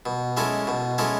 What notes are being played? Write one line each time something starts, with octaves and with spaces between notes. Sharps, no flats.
B2
G#3 C#4 E4 A4
B2
G#3 C#4 E4 A4